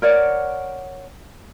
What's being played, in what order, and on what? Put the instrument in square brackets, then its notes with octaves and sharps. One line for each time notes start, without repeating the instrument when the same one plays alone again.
[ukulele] A#4 C#5 D5 F#5